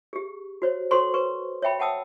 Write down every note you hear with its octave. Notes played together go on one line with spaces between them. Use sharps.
G4 G#4
F#4 C5 C#5
F#4 A4 C5 C#5 C6 C#6
B4 C#6
C#5 E5 G5 B5
F#5 G5 A5 D#6 E6